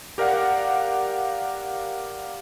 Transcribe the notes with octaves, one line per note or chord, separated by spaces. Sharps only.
G4 A#4 D5 F5 F#5